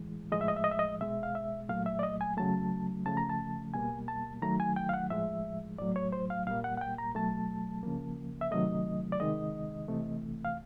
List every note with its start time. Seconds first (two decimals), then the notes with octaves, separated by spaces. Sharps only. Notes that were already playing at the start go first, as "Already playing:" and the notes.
Already playing: A2 E3 G#3
0.32 A2 F3 G#3 D#5
0.41 E5
0.48 D#5
0.56 E5
0.64 D#5
0.71 E5
0.79 D#5
1.01 B2 G#3 E5
1.23 F5
1.35 E5
1.69 A#2 F#3 A3 F5
1.86 E5
1.99 D5
2.03 D#5
2.21 G#5
2.37 C#3 F#3 A3 A5
3.06 C#3 F3 A3 A5
3.17 A#5
3.29 A5
3.74 B2 G3 A#3 G#5
4.08 A5
4.42 D#3 F#3 A3 A#5
4.60 G#5
4.76 G5
4.89 F5
4.93 F#5
5.10 A2 F3 G#3 E5
5.78 A2 F#3 A3 D5
5.96 C#5
6.12 C5
6.30 F5
6.47 A#2 G3 A#3 F5
6.64 F#5
6.77 F#5
6.81 G5
6.98 A#5
7.15 B2 F#3 A3 A5
7.83 C#3 F3 A#3
8.41 E5
8.51 C3 D#3 F#3 A3 D#5
9.12 D5
9.20 C3 D#3 G#3 D#5
9.88 C3 E3 A3
10.45 F5